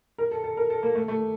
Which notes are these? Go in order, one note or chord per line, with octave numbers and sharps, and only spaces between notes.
A#4
A4
A4
A#4
A4
A#3
A3
A3